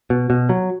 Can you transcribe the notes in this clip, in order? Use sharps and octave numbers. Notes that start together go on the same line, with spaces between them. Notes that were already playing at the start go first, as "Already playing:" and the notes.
B2
B2
F#3